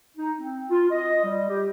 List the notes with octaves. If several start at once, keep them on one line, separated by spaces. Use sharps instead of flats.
D#4
C4
F4
D#5
G3
G4